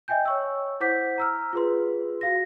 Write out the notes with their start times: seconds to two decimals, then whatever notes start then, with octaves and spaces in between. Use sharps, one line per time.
0.08 D#5 E5 G5 G#5 G6
0.25 C#5 C#6 E6
0.80 E4 C5 F#5 D6 G6 B6
1.18 A#5 E6 F6
1.53 F4 G#4 B4 C6
2.21 F#4 F5 A#6